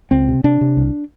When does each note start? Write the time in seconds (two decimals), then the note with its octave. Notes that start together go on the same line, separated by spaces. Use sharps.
0.11 C#2 C4
0.29 C3
0.44 C3 D4
0.61 C3
0.77 C2